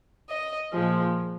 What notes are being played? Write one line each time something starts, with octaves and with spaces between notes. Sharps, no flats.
D#5
A#2 F3 G#3